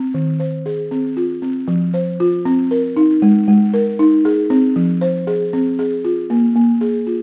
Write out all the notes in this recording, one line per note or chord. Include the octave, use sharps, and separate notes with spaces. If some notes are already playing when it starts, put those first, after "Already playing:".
Already playing: C4
D#3
C5
G#4
C4
F4
C4
F3
C5
F4
C4
A#4
D#4
G#3
G#3
A#4
D#4
G#4
C4
F3
C5
G#4
C4
G#4
F4
A#3
A#3
G#4
F4